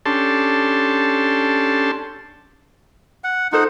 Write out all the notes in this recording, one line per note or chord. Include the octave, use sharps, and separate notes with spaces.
C#4 D4 G4 A4 A5 C6
F#5
D#4 F4 A4 C5 F#5